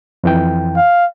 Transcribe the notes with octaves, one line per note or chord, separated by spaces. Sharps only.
F2 E3 G5
F5